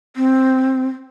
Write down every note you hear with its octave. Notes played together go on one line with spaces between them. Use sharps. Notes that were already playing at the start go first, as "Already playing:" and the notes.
C4